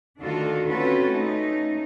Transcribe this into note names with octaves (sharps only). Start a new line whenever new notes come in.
D2 D#3 D4 F4 F#4 A4
C4 C#4 F4 F#4 A4 B4
A3 C#4 D#4